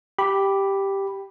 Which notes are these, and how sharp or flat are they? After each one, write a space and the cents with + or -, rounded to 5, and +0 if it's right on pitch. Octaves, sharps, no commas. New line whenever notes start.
G4 +0 B5 +0